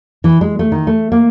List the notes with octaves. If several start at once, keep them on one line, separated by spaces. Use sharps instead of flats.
E3
G#3
A3
D#3
A3
A#3